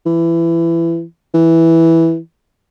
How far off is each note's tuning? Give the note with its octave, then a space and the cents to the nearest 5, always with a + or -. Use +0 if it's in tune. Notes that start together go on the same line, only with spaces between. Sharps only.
E3 +20
E3 -5